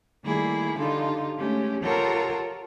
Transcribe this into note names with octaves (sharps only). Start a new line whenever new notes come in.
D#3 G3 A3 A#3 E4 G#4
D3 D#4 F4 G4 A4
G#3 A3 C#4 G4
F4 G4 A4 A#4 C#5 F#5